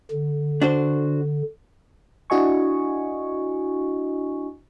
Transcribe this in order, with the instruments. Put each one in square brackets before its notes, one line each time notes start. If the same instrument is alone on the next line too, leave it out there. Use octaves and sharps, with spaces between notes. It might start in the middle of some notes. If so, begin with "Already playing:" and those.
[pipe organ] D3
[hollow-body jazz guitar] D4 F#4 C5
[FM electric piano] D4 E4 F#4 D#5 G#5 C#6